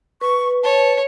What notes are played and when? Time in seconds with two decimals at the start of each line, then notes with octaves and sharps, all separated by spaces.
0.21 B4 C#6
0.63 C#5 A5